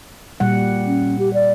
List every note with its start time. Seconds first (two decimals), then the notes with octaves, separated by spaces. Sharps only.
0.40 A#2 G3 F#5
0.86 C#4
1.19 G4
1.34 D5